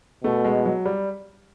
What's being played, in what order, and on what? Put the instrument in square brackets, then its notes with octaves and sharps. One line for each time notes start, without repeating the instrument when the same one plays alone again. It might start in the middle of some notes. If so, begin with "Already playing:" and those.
[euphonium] B2 [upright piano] A3
[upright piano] G#3
F#3
G3